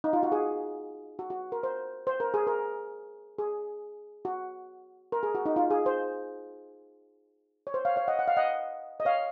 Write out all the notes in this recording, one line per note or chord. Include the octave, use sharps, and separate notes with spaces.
D#4
F4
F#4
G#4
F#4
F#4
A#4
C5
C5
A#4
G#4
A#4
G#4
F#4
A#4
G#4
F#4
D#4
F4
G#4
C5
C#5
C5
C#5 F5
C#5 F5
D#5 F#5
F#5
F5
D#5 F#5
D#5
C#5 F5